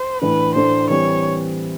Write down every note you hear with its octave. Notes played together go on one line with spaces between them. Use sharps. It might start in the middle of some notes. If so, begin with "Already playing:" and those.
Already playing: C5
A2 E3 A3 D4 B4
A2 E3 A3 D4 C5
E3 G3 C4 C#5